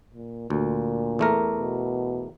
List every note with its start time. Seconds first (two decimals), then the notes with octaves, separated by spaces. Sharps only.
0.13 A#2
0.50 D2 A#2
1.19 E2 A3 A#4
1.59 B2